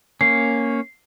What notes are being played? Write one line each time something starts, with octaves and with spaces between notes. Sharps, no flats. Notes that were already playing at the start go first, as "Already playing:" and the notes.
A#3 C#4 C7